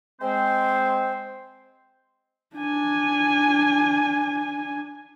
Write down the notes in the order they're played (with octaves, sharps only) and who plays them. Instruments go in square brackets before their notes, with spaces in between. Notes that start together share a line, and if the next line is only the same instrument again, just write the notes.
[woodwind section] G#3 C4 C5
[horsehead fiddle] D4 G#5